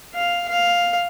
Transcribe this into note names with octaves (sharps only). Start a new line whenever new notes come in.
F5
F5